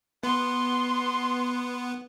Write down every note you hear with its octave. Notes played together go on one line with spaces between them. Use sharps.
B3 C6